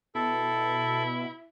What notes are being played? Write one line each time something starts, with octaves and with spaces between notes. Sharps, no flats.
B2 E4 A4